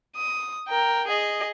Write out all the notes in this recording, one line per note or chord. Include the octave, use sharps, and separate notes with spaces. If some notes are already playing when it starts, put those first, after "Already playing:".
D#6
A#4 G5
G#4 D#5